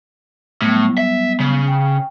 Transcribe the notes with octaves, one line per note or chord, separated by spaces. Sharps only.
A2 F#3 G3 B3
E5
C#3
G5